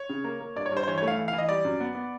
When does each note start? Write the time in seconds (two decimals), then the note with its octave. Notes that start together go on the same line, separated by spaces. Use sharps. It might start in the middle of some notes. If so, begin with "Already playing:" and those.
Already playing: C#5
0.09 C#3
0.24 A#3
0.40 A#3
0.56 G2 D5
0.66 C#5
0.72 G2 C5
0.83 C5
0.88 E3 C#5
0.98 A3 C#5
1.08 F5
1.18 E3
1.28 F5
1.33 E3
1.38 D#5
1.49 G3 D5
1.65 F#2
1.80 B3
1.95 B3